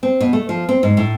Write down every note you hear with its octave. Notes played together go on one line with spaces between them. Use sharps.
C4
B2
A3
F3
C4
G#2
A2